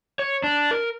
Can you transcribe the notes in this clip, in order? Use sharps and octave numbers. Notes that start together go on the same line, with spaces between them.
C#5
D4
A#4